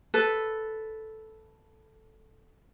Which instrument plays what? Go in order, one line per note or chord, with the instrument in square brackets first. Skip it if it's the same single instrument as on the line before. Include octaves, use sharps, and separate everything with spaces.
[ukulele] A4 B4